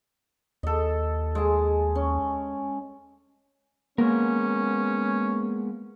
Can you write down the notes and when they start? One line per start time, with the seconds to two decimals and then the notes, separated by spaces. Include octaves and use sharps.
0.63 D#2 A4 D#5
1.35 G#3 G#4 A5
1.95 C#4
3.98 G#3 A#3 B3 C#4 A#4